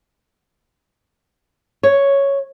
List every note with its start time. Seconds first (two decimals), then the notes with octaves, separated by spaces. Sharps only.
1.83 C#5